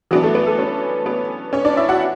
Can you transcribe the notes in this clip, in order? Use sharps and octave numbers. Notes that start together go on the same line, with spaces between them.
E3 F#3 B3 D4 F#4
A3 A4
B3 B4
A3 A4
C#4 C#5
B3 B4
C#4 C#5
D4 D5
E4 E5
F#4 F#5